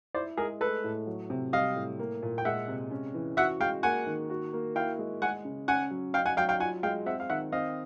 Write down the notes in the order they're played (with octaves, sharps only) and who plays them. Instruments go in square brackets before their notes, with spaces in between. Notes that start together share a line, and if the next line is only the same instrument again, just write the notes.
[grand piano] E4 [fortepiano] C5 D5
[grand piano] G#3 [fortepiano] G#4 A#4
[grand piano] A3 [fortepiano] A4 B4
[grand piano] A2
F#3
C3
[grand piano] G3 [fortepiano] D#5 F5
[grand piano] A2
A#3
A#2
[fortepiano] G5
[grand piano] G#3 [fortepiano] E5 F#5
[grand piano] C3
C#4
E3
[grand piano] F#4 [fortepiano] E5 F#5
[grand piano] G#3 [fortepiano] F5 G5
[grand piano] A#3 [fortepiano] F#5 G#5
[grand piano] D#3
F#4
A#3
[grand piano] E4 [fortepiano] F5 G5
[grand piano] G#3
[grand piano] G#3 [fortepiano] F#5 G#5
[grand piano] C#3
[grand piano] C#4 [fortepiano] F#5 G#5
[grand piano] F#3
[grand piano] D#4 [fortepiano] F5 G5
[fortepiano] F#5 G#5
[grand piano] F#3 [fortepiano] F5 G5
[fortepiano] F5 G5
[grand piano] F4 [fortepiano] F#5 G#5
[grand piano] G#3 [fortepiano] F5 G5
[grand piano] C4 [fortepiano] E5 F#5
[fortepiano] F5
[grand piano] D#3 [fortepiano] E5 F#5
[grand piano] C4 [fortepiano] D#5 F5